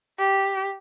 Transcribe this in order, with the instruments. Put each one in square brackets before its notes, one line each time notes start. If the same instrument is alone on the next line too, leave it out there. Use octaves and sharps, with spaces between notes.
[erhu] G4